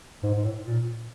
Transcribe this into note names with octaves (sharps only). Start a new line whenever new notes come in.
G#2
G#2
A2
A#2